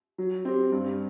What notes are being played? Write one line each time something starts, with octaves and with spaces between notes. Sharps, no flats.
F#3
C4 G4
G2